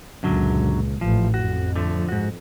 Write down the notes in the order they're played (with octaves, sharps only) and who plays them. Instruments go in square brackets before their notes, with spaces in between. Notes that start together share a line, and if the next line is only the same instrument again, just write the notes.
[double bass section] C#2 A#2 [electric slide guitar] F#2 D3 F#3
[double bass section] A1 [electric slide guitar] F3
[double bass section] F2 [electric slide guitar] F#4
[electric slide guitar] D3 F3 A3
G#2 F#4